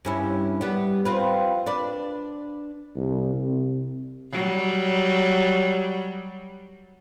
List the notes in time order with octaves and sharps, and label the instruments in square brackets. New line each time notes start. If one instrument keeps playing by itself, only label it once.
[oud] G2 C#4 E4
G3 B3
C4 F4 B4
D4 B4 D5
[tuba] C2
C3
[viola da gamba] F#3 G3